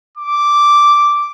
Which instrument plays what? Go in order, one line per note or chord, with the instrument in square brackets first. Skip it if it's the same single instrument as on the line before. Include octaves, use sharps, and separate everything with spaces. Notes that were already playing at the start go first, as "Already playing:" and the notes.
[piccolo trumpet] D6